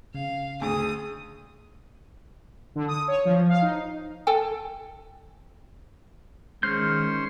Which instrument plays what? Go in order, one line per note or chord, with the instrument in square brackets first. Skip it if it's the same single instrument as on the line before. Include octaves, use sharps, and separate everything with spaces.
[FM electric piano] C#3 [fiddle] F5
[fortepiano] D2 [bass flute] G#4 [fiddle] D#6
[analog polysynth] D3
D#6
C#5
F3
F5
D#4
[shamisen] A4 G5 G#5
[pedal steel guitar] D#3 F6 G6 [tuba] G#3 [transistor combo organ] C#4 C5 C6